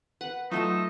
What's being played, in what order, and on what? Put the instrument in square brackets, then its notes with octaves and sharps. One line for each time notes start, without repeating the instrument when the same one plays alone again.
[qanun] B4 [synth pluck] F#5
[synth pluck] F#3 A3 E7 [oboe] D#4 [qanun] F4 E5